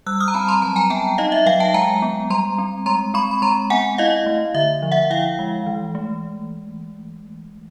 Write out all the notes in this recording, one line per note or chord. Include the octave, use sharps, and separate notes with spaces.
G3 E6 F#6
D#6 F6
A#5
C4 A5 B5
A#5 C6
F#3 A5 B5
G#5 A#5
B3 G5 A5
D#4 D#5 F5
E5
F#3 F5 G5
G5 A5
G#3 G#5 A#5
B3
G3 A#5 C6
C4
G#3 A#5 C6
C4 B5 C#6
B5
G#3 A#5 C6
B3 F#5 G#5
E4 D#5 F5
A3
D3 E5
F3
E5 F#5
E4 F5 G5
G#3
E3
A3